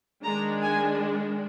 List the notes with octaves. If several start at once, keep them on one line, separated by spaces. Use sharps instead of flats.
D#3 G#3 D4 A#5
G#5